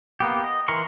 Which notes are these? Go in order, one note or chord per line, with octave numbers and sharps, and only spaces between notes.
A#3 B3 G4
D#5
E3 A#4 A#5 C6 C#6